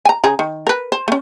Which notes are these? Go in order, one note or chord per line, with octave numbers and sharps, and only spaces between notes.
G#5 A#5
C#3 G#4 A#5
D#3
A#4 B4
C5
A3 C#4